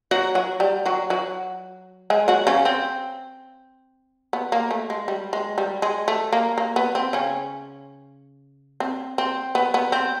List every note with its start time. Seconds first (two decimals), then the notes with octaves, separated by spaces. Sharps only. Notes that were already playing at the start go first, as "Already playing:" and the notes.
0.11 F#3 F#4
0.35 F#3 F#4
0.60 G3 G4
0.85 F#3 F#4
1.10 F#3 F#4
2.10 G#3 G#4
2.28 F#3 F#4
2.47 C#3 C#4
2.65 C4
4.33 B3
4.52 A#3
4.71 A3
4.90 G#3
5.08 G3
5.33 G#3
5.58 G3
5.82 G#3
6.08 A3
6.33 A#3
6.58 A#3
6.76 B3
6.95 C4
7.13 C#3 C#4
8.80 C4
9.18 C4
9.55 B3
9.74 B3
9.92 C4